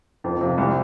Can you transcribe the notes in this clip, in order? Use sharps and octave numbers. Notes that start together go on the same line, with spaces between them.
F2
C3 F3
C2